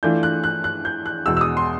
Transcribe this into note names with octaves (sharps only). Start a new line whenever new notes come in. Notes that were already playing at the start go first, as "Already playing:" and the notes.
E3 A3 D4 F4 G6
F#6
F#6
F#6
G6
F#6
E2 B2 G#3 E6
E6
D#6
C6